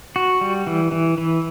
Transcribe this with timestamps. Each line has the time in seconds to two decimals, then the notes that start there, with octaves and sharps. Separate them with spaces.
0.16 F#4
0.41 G3
0.67 E3
0.92 E3
1.18 E3